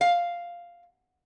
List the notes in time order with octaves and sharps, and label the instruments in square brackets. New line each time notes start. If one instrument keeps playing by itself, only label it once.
[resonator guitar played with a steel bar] F5